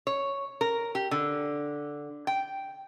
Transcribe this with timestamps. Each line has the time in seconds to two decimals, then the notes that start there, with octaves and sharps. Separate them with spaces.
0.07 C#5
0.61 A#4
0.95 G4
1.11 D3
2.27 G5